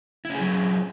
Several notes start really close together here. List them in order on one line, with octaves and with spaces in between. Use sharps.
E4 C#4 G#4 F#3 C4